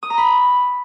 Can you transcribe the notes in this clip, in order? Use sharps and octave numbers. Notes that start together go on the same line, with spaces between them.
D#6
A#5
B5